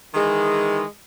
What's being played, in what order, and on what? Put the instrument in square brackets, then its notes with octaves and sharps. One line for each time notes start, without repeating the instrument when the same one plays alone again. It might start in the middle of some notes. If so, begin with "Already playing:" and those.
[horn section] D#3 E3 G#3